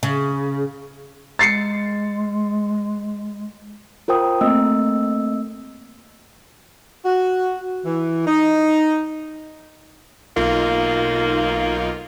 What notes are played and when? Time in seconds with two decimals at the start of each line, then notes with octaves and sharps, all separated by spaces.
0.03 C#3
1.39 G#3 A6 C7 C#7
4.08 F4 A#4 C5 G5 D#6
4.41 A3 A#3 C4 D#5 E6
7.05 F#4
7.85 E3
8.27 D#4
10.36 B1 A#3 D#4 F4